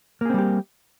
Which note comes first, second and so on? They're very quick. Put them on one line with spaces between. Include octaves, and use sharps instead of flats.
A#3 G#4 C4 G3 G4